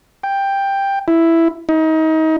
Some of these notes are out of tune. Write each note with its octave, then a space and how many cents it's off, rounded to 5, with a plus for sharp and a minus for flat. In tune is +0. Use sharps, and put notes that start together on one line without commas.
G5 +10
E4 +5
D#4 +30